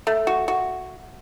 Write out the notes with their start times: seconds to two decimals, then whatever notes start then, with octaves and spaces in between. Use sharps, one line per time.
0.07 A3
0.27 F#4
0.48 F#4